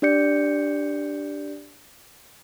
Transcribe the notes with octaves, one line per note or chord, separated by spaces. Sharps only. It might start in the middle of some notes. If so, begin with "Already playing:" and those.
D4 G4 D5 G6 C#7